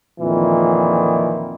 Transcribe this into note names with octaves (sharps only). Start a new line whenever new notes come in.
F2 A#2 D#3 E3